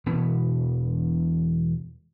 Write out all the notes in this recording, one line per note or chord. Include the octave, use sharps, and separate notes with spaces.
E1 B2 E3 B3